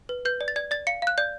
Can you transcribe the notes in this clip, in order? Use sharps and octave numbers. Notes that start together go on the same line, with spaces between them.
B4
B4 G6
D5
A6
D5 G#6
D5 A6
F5 C#7
F5 F#6
D5 G6